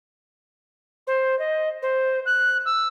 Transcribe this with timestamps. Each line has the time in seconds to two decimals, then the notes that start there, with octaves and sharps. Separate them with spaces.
1.07 C5
1.39 D#5
1.82 C5
2.26 F#6
2.65 E6